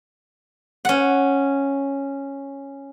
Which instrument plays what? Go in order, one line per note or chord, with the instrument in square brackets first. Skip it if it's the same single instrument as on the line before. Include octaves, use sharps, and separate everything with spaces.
[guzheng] C#4 F#5